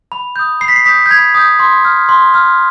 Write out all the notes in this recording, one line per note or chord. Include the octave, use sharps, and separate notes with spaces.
B5
D#6 G6
B5 C7
B6
C7
D#6 G6 B6
G6
B5 G#6
D#6 G6
C6
F6
C6
F6